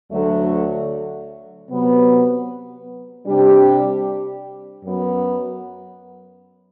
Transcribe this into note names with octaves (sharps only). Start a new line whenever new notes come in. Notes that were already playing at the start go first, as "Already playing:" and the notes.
D2 D3 F#3 A3
C3 F#3 B3
C3 G3 D4 G4
F#2 F#3 B3